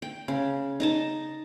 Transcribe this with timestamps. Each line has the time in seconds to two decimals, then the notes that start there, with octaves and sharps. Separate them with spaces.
0.02 G5
0.28 C#3
0.80 D#4 D#5 A5